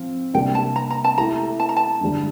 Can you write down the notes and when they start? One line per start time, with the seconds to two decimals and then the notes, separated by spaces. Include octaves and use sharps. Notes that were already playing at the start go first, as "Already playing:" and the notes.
Already playing: F3 C4 F5
0.34 C3 G3 A#3 D4 G5
0.55 A5
0.76 A#5
0.90 A#5
1.04 A5
1.18 A3 E4 G4 A#5
1.60 A5
1.69 A#5
1.77 A5
2.01 G2 D3 G3